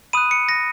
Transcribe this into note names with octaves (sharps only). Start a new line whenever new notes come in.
B5 D#6 F#6 D#7
C#7
A#6